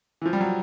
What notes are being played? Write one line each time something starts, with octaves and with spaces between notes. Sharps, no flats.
E3
F3
G3
F#3